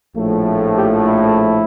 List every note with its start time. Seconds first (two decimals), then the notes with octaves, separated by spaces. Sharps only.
0.16 A#1 A2 F3 A3
0.75 G4
1.05 E4